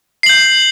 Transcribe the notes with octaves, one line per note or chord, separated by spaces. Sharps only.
G6 C7 F#7